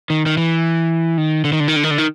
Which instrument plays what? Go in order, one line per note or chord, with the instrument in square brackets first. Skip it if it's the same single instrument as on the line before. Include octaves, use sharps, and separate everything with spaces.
[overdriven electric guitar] D#3
D#3
E3
D#3
D3
D#3
D3
D#3
D3
D#3
D3
D#3